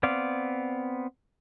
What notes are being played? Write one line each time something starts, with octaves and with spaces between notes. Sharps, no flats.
B3 C4 D5 F5